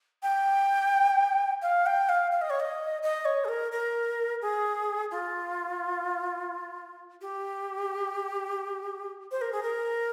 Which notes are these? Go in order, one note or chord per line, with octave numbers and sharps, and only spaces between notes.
G5
F5
G5
F5
F5
D#5
C#5
D#5
D#5
C#5
G#4
A#4
A#4
G#4
F4
G4
C5
A#4
G#4
A#4